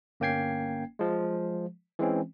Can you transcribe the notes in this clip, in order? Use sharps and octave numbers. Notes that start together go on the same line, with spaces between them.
G1 A#3 C#4 G5 G#6 C7
F3 G#3
E3 G#3 C4 C#4